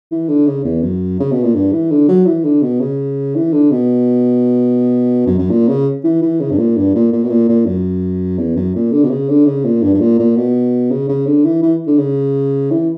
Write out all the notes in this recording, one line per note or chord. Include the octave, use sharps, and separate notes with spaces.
E3
D3
C#3
E2
F#2
C#3
B2
A#2
G2
E3
D3
F#3
E3
D3
B2
C#3
E3
D3
B2
F#2
F#2
A#2
C#3
E3
E3
C#3
G2
A#2
G2
A#2
A#2
B2
A#2
A#2
F#2
E2
F#2
A#2
D3
B2
C#3
D3
C#3
A#2
G2
G2
A#2
A#2
B2
C#3
C#3
D3
E3
E3
D3
C#3
E3